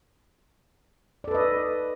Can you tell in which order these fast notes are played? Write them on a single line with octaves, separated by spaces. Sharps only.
D5 A4 B4 D#5